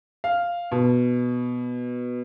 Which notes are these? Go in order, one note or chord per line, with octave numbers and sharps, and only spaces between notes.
F5
B2